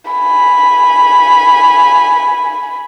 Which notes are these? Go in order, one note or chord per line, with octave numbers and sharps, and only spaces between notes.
G#5 B5